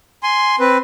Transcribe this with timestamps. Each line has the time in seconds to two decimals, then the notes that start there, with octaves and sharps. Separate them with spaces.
0.23 G#5 C6
0.60 C4 B4